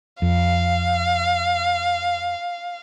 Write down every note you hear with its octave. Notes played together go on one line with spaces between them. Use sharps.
F2 F5